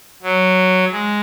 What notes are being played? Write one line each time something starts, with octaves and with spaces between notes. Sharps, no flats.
F#3
G#3